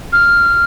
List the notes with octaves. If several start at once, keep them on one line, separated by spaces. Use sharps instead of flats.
F6